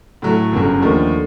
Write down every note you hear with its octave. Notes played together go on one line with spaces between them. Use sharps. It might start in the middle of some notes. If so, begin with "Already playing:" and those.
A2 F#3 A3
G1 F#2 C#3 F#3
D#2 D3 F3 A3